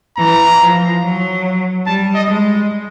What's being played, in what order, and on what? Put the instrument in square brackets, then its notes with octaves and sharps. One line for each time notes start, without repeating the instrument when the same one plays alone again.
[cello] E3 [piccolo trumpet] A#5
[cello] F3
F#3
[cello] G3 [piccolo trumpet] A5
[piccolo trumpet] D#5
[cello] G#3